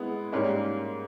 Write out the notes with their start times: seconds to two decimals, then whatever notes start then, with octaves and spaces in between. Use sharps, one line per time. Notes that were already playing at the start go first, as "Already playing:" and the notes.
Already playing: G#3 B3 E4
0.32 G#2 G3 A#3 C#4